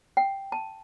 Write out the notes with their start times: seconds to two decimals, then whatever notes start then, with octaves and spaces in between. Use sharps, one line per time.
0.17 G5
0.52 A5